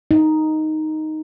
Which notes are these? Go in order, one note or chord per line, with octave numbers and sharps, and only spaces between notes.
D#4